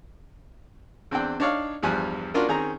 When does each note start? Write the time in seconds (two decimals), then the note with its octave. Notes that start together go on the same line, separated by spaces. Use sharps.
1.11 E2 C4 D4 G5 F#6
1.40 D4 D#4 C#5 D5 F5
1.83 E2 G2 F3 G3 G#5 F#6
2.34 A#3 C#4 D4 F4 F#4 A#4
2.49 D#3 C4 C#4 G#4 A#5